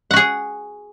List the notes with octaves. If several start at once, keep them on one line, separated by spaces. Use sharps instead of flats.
F#4 G#4 F#5